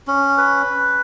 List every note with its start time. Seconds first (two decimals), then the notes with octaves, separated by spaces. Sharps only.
0.08 C#4
0.37 B4